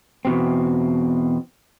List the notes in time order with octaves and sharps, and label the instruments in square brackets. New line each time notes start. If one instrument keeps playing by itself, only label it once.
[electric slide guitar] E2 B2 C4